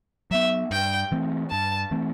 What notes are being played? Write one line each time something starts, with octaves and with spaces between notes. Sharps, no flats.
F#3 B3 E5
G2 G5
E3 A3 C4
G2 A5
E3 A3 C4